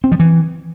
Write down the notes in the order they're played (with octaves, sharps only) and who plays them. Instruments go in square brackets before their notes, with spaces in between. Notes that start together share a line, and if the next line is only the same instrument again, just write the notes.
[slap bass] C4
F3
E3